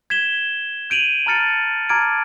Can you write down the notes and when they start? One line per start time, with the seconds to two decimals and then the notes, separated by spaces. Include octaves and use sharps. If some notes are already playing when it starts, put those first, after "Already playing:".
0.10 G#6 B6 E7 G7
0.90 G6 D7 D#7 F7 F#7
1.26 A5 A#5 F6 A6 C#7
1.89 A5 A#5 D6 F6 G#6 D7